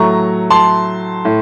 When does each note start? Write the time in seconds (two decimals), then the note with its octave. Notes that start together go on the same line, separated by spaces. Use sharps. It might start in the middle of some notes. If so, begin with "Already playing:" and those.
Already playing: A2 F#3 A3 A#5 C#6
0.50 A5 C6
1.25 A2